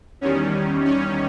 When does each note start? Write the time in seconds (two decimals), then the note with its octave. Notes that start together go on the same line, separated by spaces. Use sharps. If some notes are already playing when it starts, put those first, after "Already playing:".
0.21 E2 D#3 G3 C#4
0.85 C#4